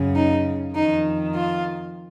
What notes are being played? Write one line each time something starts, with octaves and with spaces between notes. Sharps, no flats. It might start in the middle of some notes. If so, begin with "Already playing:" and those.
Already playing: F#2 C#3
D#4
F2 D#3 D#4
F4